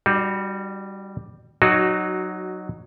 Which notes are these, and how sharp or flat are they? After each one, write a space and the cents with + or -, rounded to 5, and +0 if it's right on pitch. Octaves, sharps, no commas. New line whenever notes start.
G3 +0 D#4 -45 F#4 +0
F#3 +0 D#4 -20 F#4 +15